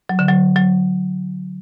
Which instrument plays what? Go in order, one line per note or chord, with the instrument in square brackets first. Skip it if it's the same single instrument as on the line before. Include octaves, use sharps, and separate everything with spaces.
[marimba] F#3
D3
F#3
F#3